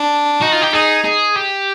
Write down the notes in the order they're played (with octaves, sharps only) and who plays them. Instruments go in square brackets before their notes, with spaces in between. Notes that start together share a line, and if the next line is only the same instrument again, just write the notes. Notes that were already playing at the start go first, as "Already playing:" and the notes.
Already playing: [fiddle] D4
[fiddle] D#4 [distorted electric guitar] F#4
[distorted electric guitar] F4
G4
[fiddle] D#4 [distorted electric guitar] G#4
[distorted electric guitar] G#4
G4